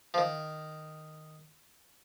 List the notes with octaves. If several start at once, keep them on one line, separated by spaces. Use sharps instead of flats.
F3
D#3